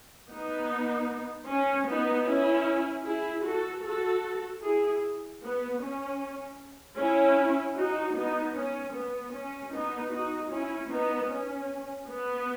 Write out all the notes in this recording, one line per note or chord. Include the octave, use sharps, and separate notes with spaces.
B3 D#4
C#4
B3 D#4
C#4 E4
E4 G#4
F#4 A4
F#4 A4
E4 G#4
B3
C#4
C#4 E4
D#4 F#4
B3 D#4
C#4
B3
C#4
B3 D#4
D#4 F#4
C#4 E4
B3 D#4
C#4
B3